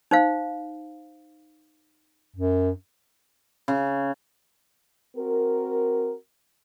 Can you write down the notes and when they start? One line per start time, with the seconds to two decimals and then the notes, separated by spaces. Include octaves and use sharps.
0.11 D#4 C5 F5
2.36 F#2
3.68 C#3
5.17 C4 F#4 A#4